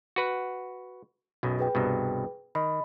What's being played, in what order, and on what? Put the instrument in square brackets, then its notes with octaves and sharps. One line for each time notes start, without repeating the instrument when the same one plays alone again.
[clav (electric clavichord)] F#4 B4 F#5
B1 F#2 B2
[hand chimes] G#4 B4 G5
[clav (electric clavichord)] C2 G2 B2
[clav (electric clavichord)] D#3 [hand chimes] D#5 B5